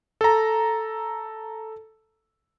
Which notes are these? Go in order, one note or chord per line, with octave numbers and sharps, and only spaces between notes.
A4 A#5